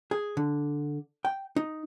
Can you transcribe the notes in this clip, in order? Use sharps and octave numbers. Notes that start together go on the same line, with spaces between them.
G#4
D3
G5
D#4